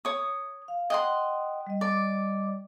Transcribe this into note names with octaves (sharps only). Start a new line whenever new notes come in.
C#5 D#6
F5
D#5 F#5 G5 C6
G3 D#5
D5